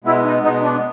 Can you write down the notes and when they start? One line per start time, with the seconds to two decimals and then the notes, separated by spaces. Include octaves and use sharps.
0.04 B2 G#3 B3 E4
0.23 D#4
0.42 B2 G#3 B3 D#4
0.61 D4